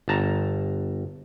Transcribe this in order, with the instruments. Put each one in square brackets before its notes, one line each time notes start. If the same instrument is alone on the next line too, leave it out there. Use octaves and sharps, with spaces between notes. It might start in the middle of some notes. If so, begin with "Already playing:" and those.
[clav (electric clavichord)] G1 A5 A#5